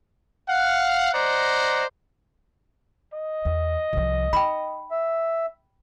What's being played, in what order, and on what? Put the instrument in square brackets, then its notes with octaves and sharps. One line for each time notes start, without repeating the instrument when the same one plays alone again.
[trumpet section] F5 F#5
C5 D5 D#5 F#5 A#5
[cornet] D#5
[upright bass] E2
C2 F3
[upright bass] D#4 [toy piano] G5 B5
[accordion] E5